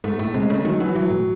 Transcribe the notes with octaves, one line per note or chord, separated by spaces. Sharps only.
G#2 A3
A2 A3
C3 G#3
C#3 A3
D#3 F#3
E3 F#3
E3 F#3
A2